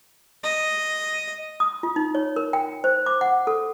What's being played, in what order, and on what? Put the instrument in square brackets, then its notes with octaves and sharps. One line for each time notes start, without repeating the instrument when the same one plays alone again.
[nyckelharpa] D#5
[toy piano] D#6
F4
D#4
C#5
A#4
G5
C5
D6
F#5
A4